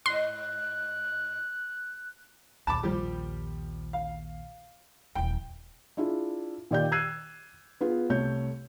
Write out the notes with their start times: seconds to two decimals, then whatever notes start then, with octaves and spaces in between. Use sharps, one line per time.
0.06 G#2 D#5 C6 F#6
2.67 A#1 D#2 A5 B5 D6
2.83 F3 G3 G4
3.93 F5
5.15 D#1 E3 G5
5.97 D4 E4 F4 G#4
6.71 A#2 D#3 G4 D5 G5 G6
6.92 E6 F#6 G#6 C7 D#7
7.81 B3 F4 G#4
8.09 C2 A3 C#5 G6